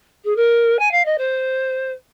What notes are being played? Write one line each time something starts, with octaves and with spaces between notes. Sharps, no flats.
G#4
A#4
G#5
F5
D#5
C5